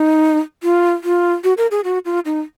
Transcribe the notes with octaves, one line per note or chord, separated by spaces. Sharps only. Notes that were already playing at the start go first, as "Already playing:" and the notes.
Already playing: D#4
F4
F4
F#4
A#4
G#4
F#4
F4
D#4